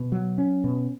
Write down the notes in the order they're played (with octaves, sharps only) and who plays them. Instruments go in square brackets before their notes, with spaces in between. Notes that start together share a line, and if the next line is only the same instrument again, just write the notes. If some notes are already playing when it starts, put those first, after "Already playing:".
Already playing: [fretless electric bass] B2
F#3
C#4
B2